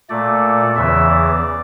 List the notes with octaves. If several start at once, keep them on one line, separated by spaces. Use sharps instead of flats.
A#2 A3 D5
E2 C#3 E3 E5
D5